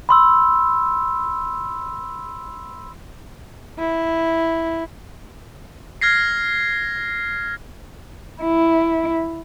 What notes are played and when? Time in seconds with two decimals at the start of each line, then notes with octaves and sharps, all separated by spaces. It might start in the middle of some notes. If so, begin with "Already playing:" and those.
0.09 B5 C6 E6
3.78 E4
6.01 F6 G#6 A#6 C7
8.43 E4